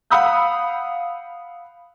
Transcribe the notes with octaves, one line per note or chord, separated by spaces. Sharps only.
F5 F#5 B5 D#6 E6 G6